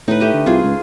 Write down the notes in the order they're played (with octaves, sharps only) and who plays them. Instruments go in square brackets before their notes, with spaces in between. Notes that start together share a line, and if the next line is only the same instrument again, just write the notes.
[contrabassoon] A2 [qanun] D#4 B4
[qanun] A3 G4 D#5
[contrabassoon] D3
[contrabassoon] C2 [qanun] F4 G#4
[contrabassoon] C#2